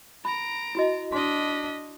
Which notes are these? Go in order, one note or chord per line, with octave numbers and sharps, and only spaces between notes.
A#5 B5 D7
E4 F#4 D#5
D4 D#5 C6 B6